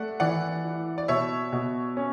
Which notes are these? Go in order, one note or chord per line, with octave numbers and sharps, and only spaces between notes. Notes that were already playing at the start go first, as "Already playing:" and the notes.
Already playing: A3 D5 E5 F#5
E3 D5 F#5
E4
D5
B2 C#5 E5
B2
C#4